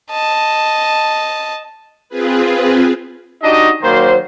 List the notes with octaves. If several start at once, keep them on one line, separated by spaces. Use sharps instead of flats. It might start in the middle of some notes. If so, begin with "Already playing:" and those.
D#5 A5
C4 F4 G#4 B4
D4 D#4 F#4 G4 D#5
D#3 F#3 A#3 C5